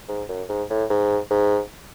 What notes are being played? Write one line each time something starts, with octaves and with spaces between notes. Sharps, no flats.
G#2
F#2
G#2
A2
G#2
G#2